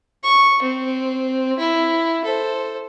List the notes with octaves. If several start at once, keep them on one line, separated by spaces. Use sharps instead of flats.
C#6
C4
E4
A4 C5